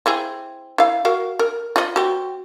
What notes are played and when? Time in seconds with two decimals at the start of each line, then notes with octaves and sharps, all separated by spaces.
0.06 C4 E4 G#4
0.78 E4 F5
1.05 F#4 A#4 F5
1.39 A#4
1.76 F4 D5 D#5
1.96 C4 F#4